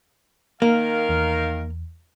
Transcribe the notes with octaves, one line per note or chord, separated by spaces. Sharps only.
D#3 A#3 A#4 F5
E2